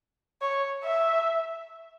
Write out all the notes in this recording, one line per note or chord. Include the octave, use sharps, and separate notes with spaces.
C#5
E5